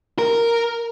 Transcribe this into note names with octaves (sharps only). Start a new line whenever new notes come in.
A#4